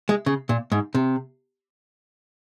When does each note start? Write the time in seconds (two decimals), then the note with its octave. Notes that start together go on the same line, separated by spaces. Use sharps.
0.09 G#3
0.26 C#3
0.49 A#2
0.72 G#2
0.95 C3